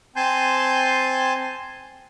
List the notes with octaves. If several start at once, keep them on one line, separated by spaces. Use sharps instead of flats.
C4 G#5 A5 C6 G6